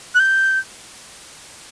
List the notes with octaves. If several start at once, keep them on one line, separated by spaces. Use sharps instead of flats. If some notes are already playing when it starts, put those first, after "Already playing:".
F#6
G6